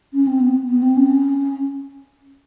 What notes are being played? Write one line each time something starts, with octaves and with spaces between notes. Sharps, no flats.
C#4
C4
B3
B3
C4
C#4